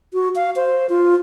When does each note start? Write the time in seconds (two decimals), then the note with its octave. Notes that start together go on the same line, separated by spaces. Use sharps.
0.14 F#4
0.36 F5
0.56 C5
0.89 F4